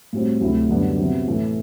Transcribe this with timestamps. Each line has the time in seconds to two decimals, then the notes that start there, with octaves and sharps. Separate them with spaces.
0.13 A2 G3 C4 F#4
0.41 D2 C3 F#3 A3 E4
0.69 F#2 D3 G3 B3 D4
0.98 C3 F#3 B3
1.27 A2 E3 A3